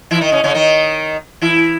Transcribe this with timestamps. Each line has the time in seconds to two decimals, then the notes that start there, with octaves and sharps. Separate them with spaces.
0.11 E3 E4
0.21 D#3 D#4
0.32 C#3 C#4
0.44 C#3 C#4
0.54 D#3 D#4
1.41 E3 E4